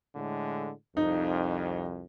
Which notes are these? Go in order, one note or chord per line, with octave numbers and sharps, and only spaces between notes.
A2 D3 G#3
C2 F2 D#4